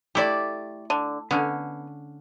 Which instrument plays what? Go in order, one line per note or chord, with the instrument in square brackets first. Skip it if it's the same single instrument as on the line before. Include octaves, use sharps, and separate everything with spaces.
[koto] A3 E4 [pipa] G4 D5
[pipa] D3
[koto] D3 C#4 [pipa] B3